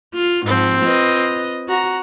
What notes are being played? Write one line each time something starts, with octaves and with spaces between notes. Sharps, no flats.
F4
G#2 F3 C4
F4 B4 D#5
F#4 A#5